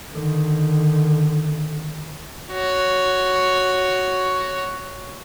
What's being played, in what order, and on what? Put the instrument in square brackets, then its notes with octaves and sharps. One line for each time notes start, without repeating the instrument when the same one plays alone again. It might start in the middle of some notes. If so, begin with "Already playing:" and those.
[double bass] D3 D#3
[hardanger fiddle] F#4 C#5